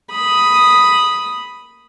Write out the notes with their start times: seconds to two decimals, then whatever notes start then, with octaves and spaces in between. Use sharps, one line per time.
0.12 B5 D#6